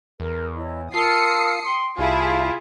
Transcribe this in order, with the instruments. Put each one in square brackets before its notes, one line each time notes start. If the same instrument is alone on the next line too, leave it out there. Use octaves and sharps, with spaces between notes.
[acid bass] E2 [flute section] A#4
[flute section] E4 C#5 D#5
[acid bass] F4 [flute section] A#4 A5 E6 [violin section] D#6 C7 C#7
[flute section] G5 [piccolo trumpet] C6
[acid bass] C2 [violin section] E4 G#4 [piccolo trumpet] F4 [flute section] G4 F5 A5